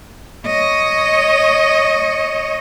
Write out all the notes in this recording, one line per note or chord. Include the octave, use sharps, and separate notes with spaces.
C#5 D#5